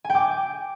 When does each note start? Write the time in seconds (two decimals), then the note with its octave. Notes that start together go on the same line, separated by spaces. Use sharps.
0.04 G#5
0.10 G5
0.15 D6